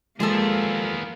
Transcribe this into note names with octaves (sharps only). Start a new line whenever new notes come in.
F3 G3 G#3 A#3 B3 G#4 A4